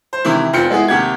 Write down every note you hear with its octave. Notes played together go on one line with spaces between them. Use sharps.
C5
C3 D#3 E3 E4
F1 C4 F4 C#7
G#3 B3 E4 G#4
D#2 C3 G4 F#5 G#6